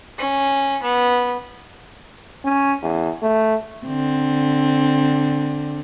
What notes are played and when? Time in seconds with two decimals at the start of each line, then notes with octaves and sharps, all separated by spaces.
0.18 C#4
0.83 B3
2.45 C#4
2.82 E2
3.22 A3
3.86 D3 C4